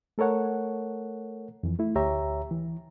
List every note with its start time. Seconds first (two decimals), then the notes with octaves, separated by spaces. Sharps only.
0.18 A3 A4 A#4 C#5 F#5
1.63 F2 E3
1.79 A3 E4
1.96 D2 G4 C#5 E5 A#5
2.51 E3